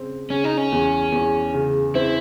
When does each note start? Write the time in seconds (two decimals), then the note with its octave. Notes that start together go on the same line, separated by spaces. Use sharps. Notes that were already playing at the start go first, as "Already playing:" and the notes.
Already playing: C#3 C4
0.30 C#3 C#4
0.44 D#4
0.57 C#4
0.72 E2
1.12 E2
1.54 C#3
1.95 C4 E4